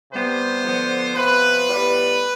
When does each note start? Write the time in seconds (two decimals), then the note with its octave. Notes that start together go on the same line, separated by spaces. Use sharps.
0.12 C3 G3 B3 C5
0.64 D3 F3 B3
1.16 C3 F3 B3 B4
1.68 A2 G3 B3